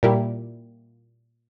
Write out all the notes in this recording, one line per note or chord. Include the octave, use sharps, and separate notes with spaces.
A#2 G3 A#3 E4 G4